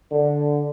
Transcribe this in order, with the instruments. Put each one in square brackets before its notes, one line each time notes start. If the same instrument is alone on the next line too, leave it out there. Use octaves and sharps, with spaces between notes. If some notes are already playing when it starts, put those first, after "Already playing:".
[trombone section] D3